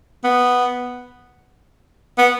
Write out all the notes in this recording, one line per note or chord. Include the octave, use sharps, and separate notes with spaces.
B3
B3